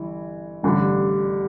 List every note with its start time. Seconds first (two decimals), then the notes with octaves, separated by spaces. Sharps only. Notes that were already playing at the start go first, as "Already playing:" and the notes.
Already playing: G1 E3
0.63 A1 G2 D3